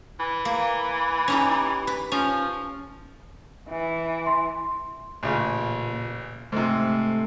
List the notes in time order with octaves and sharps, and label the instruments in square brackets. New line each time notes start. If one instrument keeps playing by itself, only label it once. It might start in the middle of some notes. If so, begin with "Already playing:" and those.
[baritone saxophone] E3
[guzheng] A#3
C#4 D#4 G4
B4
[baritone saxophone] F3 [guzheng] C#4
[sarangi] E3
[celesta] C6
[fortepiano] A1 C#3 [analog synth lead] A#2
[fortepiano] G#2 C3 [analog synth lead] A3